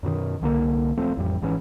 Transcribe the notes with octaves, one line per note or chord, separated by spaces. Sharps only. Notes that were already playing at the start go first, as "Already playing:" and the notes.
F#2 B2 D3 D#3
C2 D3 A3 A#3
D#1 F3 A3 C4
A1 F2 G3
G#1 G#2 E3 C#4